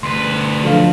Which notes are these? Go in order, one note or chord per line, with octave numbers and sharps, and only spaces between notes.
D2 B4 C6
F3 F#3 D4 A4 F5